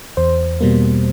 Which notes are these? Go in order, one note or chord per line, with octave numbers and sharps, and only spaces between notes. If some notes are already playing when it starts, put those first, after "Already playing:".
E2 C5
B2 G3 A#3